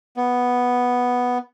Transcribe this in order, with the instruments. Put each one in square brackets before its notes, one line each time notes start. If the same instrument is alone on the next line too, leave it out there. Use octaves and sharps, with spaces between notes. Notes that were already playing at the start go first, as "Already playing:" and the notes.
[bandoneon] B3